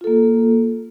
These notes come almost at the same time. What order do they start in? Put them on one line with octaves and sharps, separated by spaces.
F4 A4 A#3